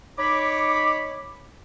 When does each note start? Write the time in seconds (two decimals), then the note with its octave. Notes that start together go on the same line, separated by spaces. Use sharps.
0.18 D#4 C#5 B5 D6